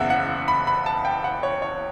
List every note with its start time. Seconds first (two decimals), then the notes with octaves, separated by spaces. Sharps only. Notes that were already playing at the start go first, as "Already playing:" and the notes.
Already playing: F#1 E2 C#3 E5 F#5
0.10 F#5
0.48 B5
0.67 B5
0.86 A5
1.05 G5
1.24 F#5
1.43 C#5
1.62 C#5